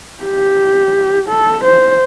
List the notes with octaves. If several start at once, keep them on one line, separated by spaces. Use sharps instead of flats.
G4
A4
C5